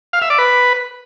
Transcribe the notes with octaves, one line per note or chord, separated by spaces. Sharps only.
F5
E5
D5
B4